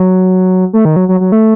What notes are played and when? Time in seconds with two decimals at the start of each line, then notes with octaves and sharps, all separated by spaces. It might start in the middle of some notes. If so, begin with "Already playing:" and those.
Already playing: F#3
0.73 A3
0.85 D#3
0.96 F#3
1.09 F#3
1.20 F#3
1.32 A3